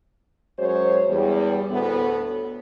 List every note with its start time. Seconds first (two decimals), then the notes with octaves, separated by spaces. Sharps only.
0.59 F#2 G#3 F#4 C5 C#5
1.09 E2 G3
1.71 D2 A2 B3